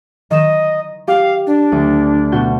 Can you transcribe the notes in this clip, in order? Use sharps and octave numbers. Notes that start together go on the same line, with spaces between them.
D#3 D#5 E7
G4 F5
D4
D2
B2 F#4 G6